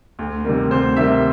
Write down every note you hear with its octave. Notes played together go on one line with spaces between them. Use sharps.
D2
C3 D#3 G3 A#3
D2 C5
C3 D#3 G3 A#3 E5